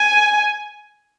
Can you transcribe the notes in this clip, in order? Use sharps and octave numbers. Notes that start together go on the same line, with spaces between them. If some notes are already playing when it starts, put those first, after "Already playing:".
Already playing: G#5